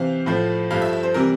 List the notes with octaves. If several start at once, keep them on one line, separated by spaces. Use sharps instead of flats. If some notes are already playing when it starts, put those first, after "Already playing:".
Already playing: C3 E3 C4 F5
A2 F3 A3
G2 F3 A3 F5
E5
E5
C5
C3 E3 G3 A#4